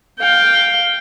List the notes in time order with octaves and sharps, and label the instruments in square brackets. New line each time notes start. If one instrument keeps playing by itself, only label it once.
[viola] F5 G5